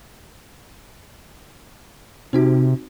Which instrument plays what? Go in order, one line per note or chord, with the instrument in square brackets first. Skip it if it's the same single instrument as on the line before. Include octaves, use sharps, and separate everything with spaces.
[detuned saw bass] C3 [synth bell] C4 D#4 F#4